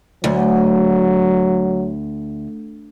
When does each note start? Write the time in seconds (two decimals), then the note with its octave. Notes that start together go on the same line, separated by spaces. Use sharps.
0.24 D2 F#3